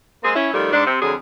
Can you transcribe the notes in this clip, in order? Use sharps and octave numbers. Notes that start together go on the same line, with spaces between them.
G#3 A#3 C4 G#4
C#4 E4
D#3 F3 G3 A3
G#2 D4
C3
F2 D3 F#3 G#4